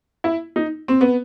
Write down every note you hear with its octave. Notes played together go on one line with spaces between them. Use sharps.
E4
D#4
C4
B3